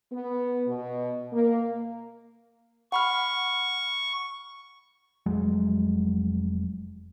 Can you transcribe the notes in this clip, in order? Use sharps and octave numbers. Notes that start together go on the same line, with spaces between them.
B3
B2
A#3
F#5 B5 C#6 F6
F1 F#3 G#3